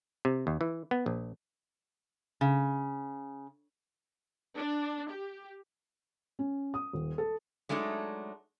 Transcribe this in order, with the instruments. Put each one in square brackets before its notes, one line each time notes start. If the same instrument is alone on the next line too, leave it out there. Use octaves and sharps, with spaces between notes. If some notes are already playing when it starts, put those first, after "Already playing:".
[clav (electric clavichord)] C3
D#2
E3
B3
A#1
[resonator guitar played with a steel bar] C#3
[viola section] D4
G4
[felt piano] C#4
D#6
D#1
A4
[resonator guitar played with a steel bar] F#3 G#3 A3 D4 D#4